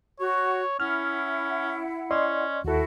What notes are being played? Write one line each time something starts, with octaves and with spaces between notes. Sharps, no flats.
F#4 C#5
C#4 E4 F#5 F6
C#4 D5 D#5 C6
D#2 E4 F#4 A4